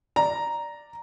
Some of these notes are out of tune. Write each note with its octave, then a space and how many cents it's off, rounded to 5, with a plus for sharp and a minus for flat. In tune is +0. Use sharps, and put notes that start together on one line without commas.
D5 +0 A#5 +0